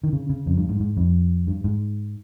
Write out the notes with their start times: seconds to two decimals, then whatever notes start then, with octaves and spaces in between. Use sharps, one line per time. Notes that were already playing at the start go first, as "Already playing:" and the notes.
0.04 D#3
0.13 C#3
0.30 C#3
0.46 F2
0.58 G2
0.69 G#2
0.80 G#2
0.97 F2
1.47 G2
1.64 G#2